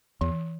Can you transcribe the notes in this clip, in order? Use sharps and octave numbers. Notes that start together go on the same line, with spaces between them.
E2 E3